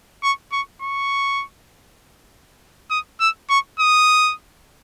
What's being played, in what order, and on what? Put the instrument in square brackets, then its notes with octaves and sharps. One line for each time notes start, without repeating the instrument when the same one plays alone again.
[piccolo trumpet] C#6
C#6
C#6
D#6
E6
C#6
D#6